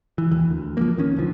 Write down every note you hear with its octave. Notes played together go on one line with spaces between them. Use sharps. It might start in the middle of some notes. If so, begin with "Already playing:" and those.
E3
D#2 E3
D2
F3 G3 A#3
A1 D#3 C#4
B1 D3 F3